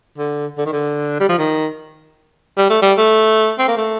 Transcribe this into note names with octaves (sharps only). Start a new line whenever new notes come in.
D3
D3
D#3
D3
G3
F3
D#3
G3
A3
G3
A3
C4
A#3
A3